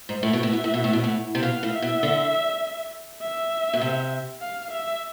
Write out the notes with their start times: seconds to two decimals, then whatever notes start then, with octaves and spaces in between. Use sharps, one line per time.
0.09 G#2
0.23 A2 E5
0.33 B2
0.43 A2
0.53 B2
0.64 A2
0.74 B2
0.84 A2
0.93 B2
1.04 A2
1.35 C3
1.43 B2 F5
1.63 A2
1.72 E5
1.82 B2
2.03 D3
3.22 E5
3.74 B2
3.81 C3
4.41 F5
4.71 E5